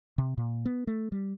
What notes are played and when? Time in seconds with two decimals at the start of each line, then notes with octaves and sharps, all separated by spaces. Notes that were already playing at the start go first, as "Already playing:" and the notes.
0.18 C3
0.38 A#2
0.65 B3
0.87 A3
1.12 G3